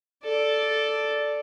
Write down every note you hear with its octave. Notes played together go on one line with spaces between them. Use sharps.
A4 D5